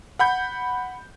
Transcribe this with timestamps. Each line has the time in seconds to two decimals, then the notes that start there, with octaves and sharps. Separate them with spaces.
0.19 F#5 B5 G6